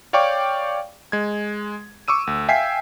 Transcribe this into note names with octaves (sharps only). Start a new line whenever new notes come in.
C#5 D5 F5 G5 C#6 D6
G#3 G#6
C#6 D6 E6 D#7
D2
E5 F5 G5 G#5 B6 C7